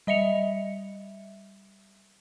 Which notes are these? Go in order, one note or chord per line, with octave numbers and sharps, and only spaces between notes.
G3 D#5 E5 C#7 F7